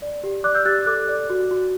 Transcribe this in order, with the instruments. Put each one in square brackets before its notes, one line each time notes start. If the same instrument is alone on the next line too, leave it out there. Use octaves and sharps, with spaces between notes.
[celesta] D5
G4
D5 D6 F#6
E6 G6
G4 F#6 A6
A4 D6 F#6
D5
F#4
F#4